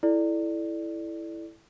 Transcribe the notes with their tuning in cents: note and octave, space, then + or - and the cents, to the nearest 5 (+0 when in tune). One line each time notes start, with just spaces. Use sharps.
E4 +0 A4 -10 D5 +5